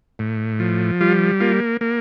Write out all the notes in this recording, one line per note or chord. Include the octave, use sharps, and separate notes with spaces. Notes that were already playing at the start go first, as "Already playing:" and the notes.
A2
F3
G3 F4
A#3 F4
A#3